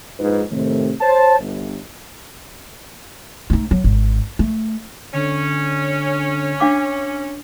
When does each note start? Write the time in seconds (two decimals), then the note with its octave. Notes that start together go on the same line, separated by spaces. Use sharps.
0.20 A#1 G#2 G#3 D#4 F4 B4
0.51 A2 C3 D#3 A3
1.00 C5 C#5 A5
1.40 G1
3.50 A3 D#4
3.71 F#3
3.84 G#1
4.39 A3
5.14 D3 C#4
6.60 D4 F5 D6